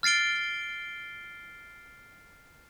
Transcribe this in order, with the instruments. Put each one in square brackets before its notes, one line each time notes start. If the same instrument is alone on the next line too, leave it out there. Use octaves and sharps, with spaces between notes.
[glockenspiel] F6 A6 C7 D7 G7